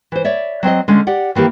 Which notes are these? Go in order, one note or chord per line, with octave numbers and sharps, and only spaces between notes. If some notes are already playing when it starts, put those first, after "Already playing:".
E3 C5
C#5 D5 E5
F#3 C4 C5 D#5
D3 G#3 C#4
G4 D5 F#5
D#3 E3 A#3 G4